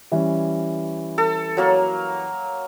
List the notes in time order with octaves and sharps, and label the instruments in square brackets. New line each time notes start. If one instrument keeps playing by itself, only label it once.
[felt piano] E3 G3 C#4
[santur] A4
F#3 A#3 A#4